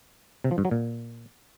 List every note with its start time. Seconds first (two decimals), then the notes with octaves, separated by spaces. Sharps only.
0.44 C3
0.51 F3
0.58 G2
0.65 F#3
0.71 A#2